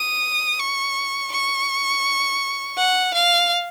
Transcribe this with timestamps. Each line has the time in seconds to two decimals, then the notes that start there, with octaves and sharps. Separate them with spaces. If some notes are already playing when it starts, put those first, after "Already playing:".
Already playing: D#6
0.60 C#6
1.32 C#6
2.77 F#5
3.14 F5